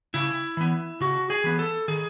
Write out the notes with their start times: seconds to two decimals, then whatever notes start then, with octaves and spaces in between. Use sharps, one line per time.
0.14 C#3 E4
0.57 E3 B3
1.01 C#3 F#4
1.30 G#4
1.44 E3 B3
1.59 A4
1.88 D#3 G#4